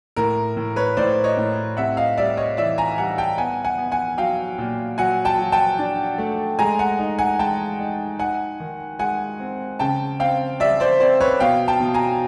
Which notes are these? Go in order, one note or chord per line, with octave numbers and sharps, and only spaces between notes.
A2 A#4
A2
B4 C#5
A2 C5 D5
C#5 D#5
A2
C3 E5 F#5
D#5 F5
G3 D5 E5
C#5 D#5
E3 D5 E5
G#5 A#5
G3 F#5 G#5
G5 A5
B3 F#5 G#5
F#5 G#5
B3
F#5 G#5
F#3 F5 G5
A#2
F#3 F#5 G#5
G5 A5
F#3
G5 A5
D4
A3
G#3 G#5 A#5
F#5 G#5
D#4
F#5 G#5
G#3 G5 A5
D#4
D#4 F#5 G#5
D#3
G#3 F#5 G#5
C4
C#3 G5 A5
C4 F5 G5
G3 D5 E5
C5 D5
C4 C5 D5
B4 C#5
B2 F5 G5
G5 A5
B2
G#5 A#5